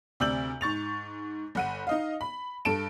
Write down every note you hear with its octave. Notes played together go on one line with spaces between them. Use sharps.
D2 C3 D5 E6 G6 F#7
G#2 C#6 A6 F7
G1 F#5 D#7
D#4 D#5 F5
B5
G2 A4 A5 D7 E7